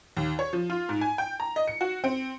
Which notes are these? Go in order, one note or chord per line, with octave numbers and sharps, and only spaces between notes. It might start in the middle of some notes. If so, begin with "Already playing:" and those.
D#2
C#5
F3
F4
G#2
G#5
G5
A#5
D#5
C#7
F#4
C4